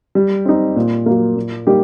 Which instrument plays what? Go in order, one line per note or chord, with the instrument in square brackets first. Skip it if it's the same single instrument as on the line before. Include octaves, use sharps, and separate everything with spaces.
[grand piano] G3
C4 D#4
A#2
F#3 A#3
A#2
G3 A#3 D#4 G4